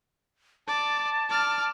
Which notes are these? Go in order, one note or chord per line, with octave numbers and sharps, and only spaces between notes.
D5 A5
D5 F6